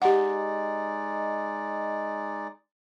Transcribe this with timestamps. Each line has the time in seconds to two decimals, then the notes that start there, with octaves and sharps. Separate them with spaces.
0.02 G#3 D#4 G4 D5 F#5